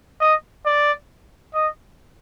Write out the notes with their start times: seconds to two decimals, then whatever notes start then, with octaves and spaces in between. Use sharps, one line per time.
0.20 D#5
0.65 D5
1.54 D#5